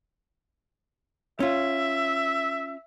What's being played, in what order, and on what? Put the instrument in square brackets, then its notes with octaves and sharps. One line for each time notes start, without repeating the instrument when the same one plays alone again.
[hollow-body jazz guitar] C#4 F4 [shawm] E5